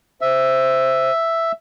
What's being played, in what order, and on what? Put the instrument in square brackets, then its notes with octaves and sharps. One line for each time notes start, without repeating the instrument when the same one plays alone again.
[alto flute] C5 [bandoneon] E5